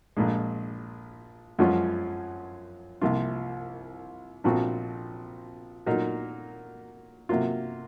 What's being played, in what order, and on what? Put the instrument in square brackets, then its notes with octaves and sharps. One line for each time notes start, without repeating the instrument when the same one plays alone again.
[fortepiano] A#1 A#2 G#3
F#2 F3 G#3 C#4 F4
C2 C3 F3 A#3 F4
A#1 A#2 F3 C4 F#4
A#2 F#3 A#3 D#4
C3 F#3 A#3 F4